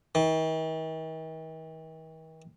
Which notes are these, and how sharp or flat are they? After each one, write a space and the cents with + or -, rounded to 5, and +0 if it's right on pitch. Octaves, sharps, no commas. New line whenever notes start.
D#3 +45